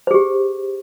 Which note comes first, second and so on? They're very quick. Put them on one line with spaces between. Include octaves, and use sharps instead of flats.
C5 G#4 G4